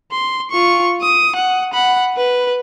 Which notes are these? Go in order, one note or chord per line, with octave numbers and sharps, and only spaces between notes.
C6
F4 C#6
D#6
F#5
F#5 B5
B4